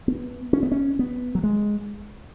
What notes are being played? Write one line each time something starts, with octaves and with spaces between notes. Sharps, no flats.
B3
C#4
B3
C#4
B3
F#3
G#3